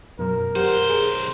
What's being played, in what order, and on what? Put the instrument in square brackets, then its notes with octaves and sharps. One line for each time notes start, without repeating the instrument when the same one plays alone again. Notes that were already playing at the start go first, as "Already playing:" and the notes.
[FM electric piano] F#2 B2 F#3 [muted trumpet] A#4
[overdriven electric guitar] B1 C5 [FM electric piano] G4 F#5
[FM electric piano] G#4